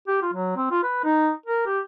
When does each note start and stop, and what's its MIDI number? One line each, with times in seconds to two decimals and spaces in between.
0.08 0.17 67
0.22 0.32 65
0.34 0.53 54
0.57 0.71 60
0.71 0.81 65
0.84 1.02 71
1.04 1.31 63
1.46 1.63 70
1.66 1.79 67